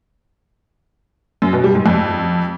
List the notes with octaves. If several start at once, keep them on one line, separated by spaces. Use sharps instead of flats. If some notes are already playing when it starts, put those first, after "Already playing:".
F#2
B2
G3
G#2
F2